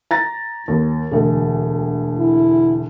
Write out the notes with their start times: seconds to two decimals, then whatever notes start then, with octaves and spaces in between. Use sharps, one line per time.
0.11 A#5 A6 A#6
0.68 D#2
1.11 E1 D2
2.18 E4